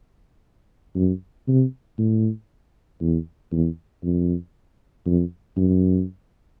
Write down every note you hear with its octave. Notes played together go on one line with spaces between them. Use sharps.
F#2
C3
A2
E2
E2
F2
F2
F#2